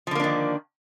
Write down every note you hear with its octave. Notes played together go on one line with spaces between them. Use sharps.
D3 D#3 F3 A#3 D4